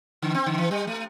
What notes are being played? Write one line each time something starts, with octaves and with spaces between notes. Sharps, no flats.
D3
C4
D3
E3
G3
A3